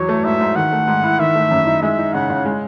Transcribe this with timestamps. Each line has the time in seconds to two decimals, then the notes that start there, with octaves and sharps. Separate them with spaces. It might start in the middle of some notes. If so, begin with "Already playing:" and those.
Already playing: E2 F#3 C#5
0.09 A3
0.24 G#2 E5
0.41 G#2
0.56 D#3 F#5
0.72 A3
0.87 G#2
1.03 E4
1.19 D#3 E5
1.35 A3
1.51 F#2
1.66 D#4
1.82 G#3 E5
1.98 D#4
2.13 C#3 F#5
2.30 C#3
2.45 G#3